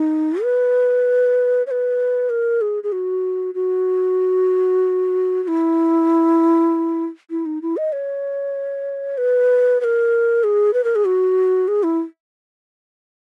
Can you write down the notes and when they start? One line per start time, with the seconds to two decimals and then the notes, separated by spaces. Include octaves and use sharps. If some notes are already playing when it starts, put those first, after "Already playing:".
Already playing: D#4
0.43 B4
1.67 C#5
1.71 B4
2.30 A#4
2.61 G#4
2.83 G#4
2.92 F#4
3.54 F#4
5.43 F#4
5.48 E4
7.31 E4
7.46 D#4
7.62 E4
7.77 D#5
7.92 C#5
9.18 B4
9.81 B4
9.84 A#4
10.44 G#4
10.74 B4
10.84 A#4
10.95 G#4
11.05 F#4
11.68 G#4
11.83 E4